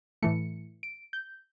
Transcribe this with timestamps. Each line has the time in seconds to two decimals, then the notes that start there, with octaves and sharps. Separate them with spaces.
0.22 A2 E3 A3 C#7
0.83 D7
1.13 G6